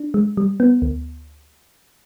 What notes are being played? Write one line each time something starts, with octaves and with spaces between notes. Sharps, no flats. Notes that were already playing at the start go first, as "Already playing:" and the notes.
Already playing: D4
G#3
G3
B3
D2